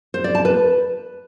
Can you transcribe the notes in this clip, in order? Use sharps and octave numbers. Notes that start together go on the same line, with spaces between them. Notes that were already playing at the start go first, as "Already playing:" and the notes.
C5
D5
A5
B4